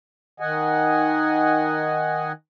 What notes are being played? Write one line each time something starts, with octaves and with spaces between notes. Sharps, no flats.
D#3 D#5 F#5 G#5